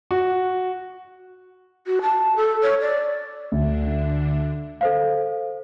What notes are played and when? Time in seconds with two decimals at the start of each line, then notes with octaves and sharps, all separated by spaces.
0.11 F#4
1.87 F#4
2.02 A5
2.36 A4
2.63 C#5
2.81 D5
3.52 D2 D3 D4
4.81 A4 C5 F5